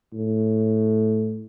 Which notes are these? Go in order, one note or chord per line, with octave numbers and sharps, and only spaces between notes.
A2